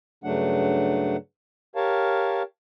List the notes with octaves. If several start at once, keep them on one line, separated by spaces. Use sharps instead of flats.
G2 C#3 F#3 A3 D4 F#5
G4 A#4 C#5 F5 A5